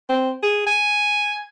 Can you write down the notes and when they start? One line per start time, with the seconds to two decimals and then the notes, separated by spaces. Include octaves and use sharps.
0.09 C4
0.43 G#4
0.67 G#5